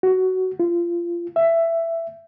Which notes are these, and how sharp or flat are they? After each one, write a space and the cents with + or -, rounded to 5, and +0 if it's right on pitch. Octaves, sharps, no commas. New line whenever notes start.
F#4 +15
F4 -25
E5 +15